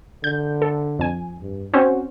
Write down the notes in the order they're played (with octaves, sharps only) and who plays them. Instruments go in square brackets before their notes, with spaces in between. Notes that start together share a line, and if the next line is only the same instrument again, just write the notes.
[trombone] D3 [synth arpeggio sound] G6
[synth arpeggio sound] A4
F2 G#5
[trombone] G2
[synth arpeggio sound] C4 C#4 C5 [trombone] F#4